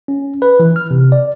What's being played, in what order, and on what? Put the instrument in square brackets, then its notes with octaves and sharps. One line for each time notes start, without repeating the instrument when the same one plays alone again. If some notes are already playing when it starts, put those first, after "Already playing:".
[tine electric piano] C#4
B4
E3
F6
C3
D5